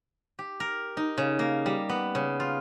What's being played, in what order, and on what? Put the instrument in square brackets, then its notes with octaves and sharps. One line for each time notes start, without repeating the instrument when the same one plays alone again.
[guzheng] G4
A#4
D#4
C#3
A#3
G3
B3
C#3
F4